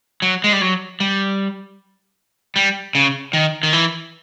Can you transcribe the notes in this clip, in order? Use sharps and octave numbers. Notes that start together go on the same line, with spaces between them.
F#3
G#3
G3
F#3
G3
G3
C#3
D#3
D#3
E3